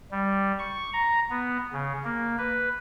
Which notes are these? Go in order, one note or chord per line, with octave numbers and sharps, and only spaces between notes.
G3
C#6
A#5
B3
C#3
A#3
B4